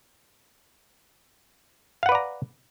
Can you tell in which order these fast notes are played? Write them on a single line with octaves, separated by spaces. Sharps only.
F5 F#5 B4 D5 A#5